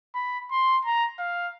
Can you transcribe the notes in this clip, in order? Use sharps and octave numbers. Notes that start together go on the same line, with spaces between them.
B5
C6
A#5
F5